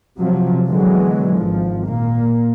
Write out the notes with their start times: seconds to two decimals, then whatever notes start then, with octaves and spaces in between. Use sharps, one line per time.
0.19 C3 F3 F#3
0.69 B2 D3 E3 F#3 G#3
1.38 G#1 F3
1.85 A#2 A#3